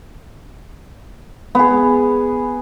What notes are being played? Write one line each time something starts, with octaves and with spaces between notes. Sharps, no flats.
B3 G#4